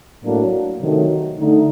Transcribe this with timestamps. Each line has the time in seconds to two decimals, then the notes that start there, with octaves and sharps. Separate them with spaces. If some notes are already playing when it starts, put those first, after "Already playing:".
0.23 A2 F#3 A#3 D4
0.81 C3 D#3 F#3 A3
1.39 D3 A3 D#4